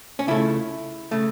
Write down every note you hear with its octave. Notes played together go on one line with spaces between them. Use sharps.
C#4
C#2 C#3 A3 E4
C#3 A3